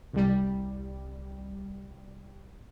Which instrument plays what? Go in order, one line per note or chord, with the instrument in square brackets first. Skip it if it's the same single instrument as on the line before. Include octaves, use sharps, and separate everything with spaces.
[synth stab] C2 G3